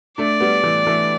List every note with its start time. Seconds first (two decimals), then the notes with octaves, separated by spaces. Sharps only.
0.18 A3 D4 D5
0.40 G3 B3
0.63 E3 A3
0.87 E3 A3